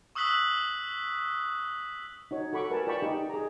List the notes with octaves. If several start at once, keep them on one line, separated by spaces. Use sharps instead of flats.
C#6 D#6 E6 F#6 B6 F#7
D#4 F#4 C#5
F#4 A4 B5 C#6 D6
G4 A#4 B4 G#5 A5
F4 D5 G5 A5 B5 C#6
D#4 G4
G#4 A#5